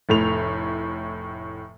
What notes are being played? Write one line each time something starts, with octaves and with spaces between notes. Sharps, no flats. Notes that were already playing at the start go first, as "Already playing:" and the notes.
F1 A2 F7